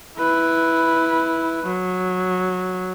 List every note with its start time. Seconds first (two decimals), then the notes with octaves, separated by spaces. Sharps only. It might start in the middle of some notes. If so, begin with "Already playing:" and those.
0.18 E4 B4
1.65 F#3